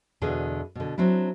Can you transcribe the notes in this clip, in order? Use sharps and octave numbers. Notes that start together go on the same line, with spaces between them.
E2 B2 D3 G#4
B2 D3
F#3 C4 D4 E4